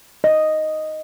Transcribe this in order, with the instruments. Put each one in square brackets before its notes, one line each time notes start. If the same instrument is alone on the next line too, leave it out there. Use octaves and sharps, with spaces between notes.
[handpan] D#5